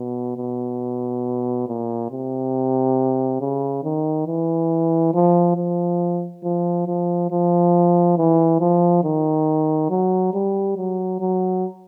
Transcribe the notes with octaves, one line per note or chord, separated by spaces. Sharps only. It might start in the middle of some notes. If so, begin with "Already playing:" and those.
Already playing: B2
B2
A#2
C3
C#3
D#3
E3
F3
F3
F3
F3
F3
E3
F3
D#3
F#3
G3
F#3
F#3